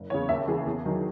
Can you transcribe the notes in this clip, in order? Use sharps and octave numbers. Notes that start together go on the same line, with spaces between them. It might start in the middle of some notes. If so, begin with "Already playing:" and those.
Already playing: F#1
E2 C#3 C#5
D#2 E5
C#3 E3 G#4
E2
D#3 F#3